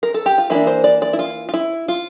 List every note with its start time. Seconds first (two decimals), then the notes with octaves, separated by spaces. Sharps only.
0.03 A#4
0.14 A4
0.26 G4
0.38 F4
0.50 E3 A#3 D4 E4
0.67 C5
0.84 D5
1.02 D5
1.13 E4
1.19 F4
1.49 F4
1.54 E4
1.88 F4